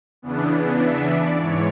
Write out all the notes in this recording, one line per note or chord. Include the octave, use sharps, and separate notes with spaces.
E2 C#3 E3 B3 D4
E5
D5
G#2 E3 C#5